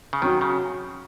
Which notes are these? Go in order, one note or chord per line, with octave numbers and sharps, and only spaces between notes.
C#3
D#3 F#3 C#4 F#4
C#3